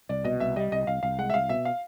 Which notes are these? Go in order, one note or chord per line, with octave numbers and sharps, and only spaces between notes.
C2 D5
B2 D#5
C2 E5
G3 D#5
C2 D#5
C2 F5
C2 F5
G#3 F#5
E5
C2 F5
B2 E5
F5